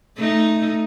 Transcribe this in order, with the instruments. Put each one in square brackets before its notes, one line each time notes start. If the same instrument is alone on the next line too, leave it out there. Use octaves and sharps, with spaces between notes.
[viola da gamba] A3 D#4